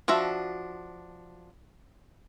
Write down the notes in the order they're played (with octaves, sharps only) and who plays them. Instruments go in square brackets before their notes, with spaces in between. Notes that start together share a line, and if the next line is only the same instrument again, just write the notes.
[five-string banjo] F3 D4 F#4 E5